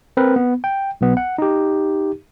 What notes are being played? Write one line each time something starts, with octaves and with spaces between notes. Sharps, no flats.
C4 A#4 B4
B3
G5
B1 B3
F#5
D#4 G4